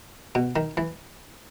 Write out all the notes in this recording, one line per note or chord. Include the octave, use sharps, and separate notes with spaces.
B2
D#3
E3